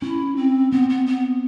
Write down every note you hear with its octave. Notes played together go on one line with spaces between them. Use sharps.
C#4 E4
C4
B3 C4
B3
B3